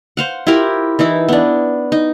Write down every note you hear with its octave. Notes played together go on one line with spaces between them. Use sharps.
C5 F5 F#5
E4 F4 G4 A#4
E3 D#4 E4
B3 D4
D#4